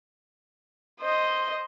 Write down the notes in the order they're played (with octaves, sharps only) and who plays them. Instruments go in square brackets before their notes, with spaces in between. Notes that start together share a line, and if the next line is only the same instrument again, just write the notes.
[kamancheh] C5 D#5